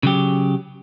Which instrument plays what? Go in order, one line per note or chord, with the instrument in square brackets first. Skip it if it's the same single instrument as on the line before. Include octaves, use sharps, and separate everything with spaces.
[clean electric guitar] C#3 F#3 G4